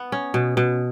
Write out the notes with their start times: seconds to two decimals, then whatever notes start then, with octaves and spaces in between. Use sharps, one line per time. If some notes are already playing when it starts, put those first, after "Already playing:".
Already playing: B3
0.12 C#4
0.34 B2
0.57 B2